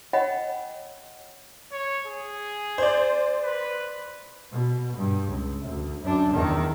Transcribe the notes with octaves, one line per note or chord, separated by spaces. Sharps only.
C#5 D#5 F#5 G5 B5
C#5
G#4
C5 D5
B4
B2
G2
C#2
D2
F#2 D4
E2 D#3